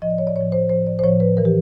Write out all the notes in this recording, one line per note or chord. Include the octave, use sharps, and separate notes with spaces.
A2 F3 D#5
D5
C#5
D5
A2 F3 C#5
C5
A2 F3 C5
D5
C5
A2 F3 C#5
B4
E3 A#4
G4